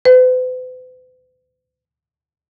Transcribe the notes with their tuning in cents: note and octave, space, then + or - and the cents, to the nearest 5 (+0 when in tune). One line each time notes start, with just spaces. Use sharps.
B4 +45